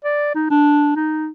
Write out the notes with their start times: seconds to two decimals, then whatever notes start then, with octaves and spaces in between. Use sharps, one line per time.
0.04 D5
0.35 D#4
0.50 D4
0.96 D#4